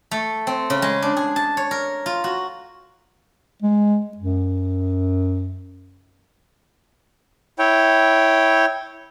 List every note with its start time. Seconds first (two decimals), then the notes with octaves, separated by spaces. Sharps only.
0.11 A3
0.47 C4
0.70 C#3
0.82 G#3
1.02 D4
1.17 G#4
1.36 A5
1.57 C#5
1.71 A#4
2.06 F4
2.24 F#4
3.63 G#3
4.17 F#2
7.59 E4 C#5 G5